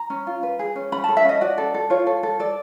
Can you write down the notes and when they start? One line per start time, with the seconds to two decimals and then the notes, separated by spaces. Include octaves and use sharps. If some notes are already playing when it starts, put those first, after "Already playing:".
Already playing: A#5
0.10 C#4
0.27 F4
0.43 B4
0.59 G#4
0.76 C#4
0.92 C#4 B5
1.04 A4 A5
1.17 E5
1.25 C#4 D#5
1.41 F#4 D5
1.58 A4
1.74 A4
1.90 F4 C#5
2.07 A4
2.23 A4
2.40 A4 D5